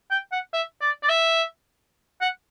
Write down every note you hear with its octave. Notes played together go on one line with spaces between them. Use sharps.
G5
F#5
E5
D5
D5
E5
F#5